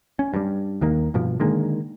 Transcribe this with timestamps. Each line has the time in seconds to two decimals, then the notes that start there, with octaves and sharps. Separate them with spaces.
0.19 C#4
0.34 G2 G3
0.81 D#2 D#3 A#3
1.14 G2 B2 F3
1.40 D3 D#3 G#3 A#3